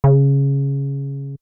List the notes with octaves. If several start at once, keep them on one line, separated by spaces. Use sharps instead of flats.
C#3